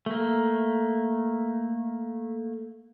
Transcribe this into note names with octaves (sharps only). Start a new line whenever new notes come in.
A3 A#3